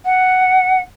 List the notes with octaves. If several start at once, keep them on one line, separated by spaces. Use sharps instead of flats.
F#5